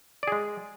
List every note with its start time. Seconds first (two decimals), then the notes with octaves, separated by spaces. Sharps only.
0.23 D5
0.27 G#4
0.32 G#3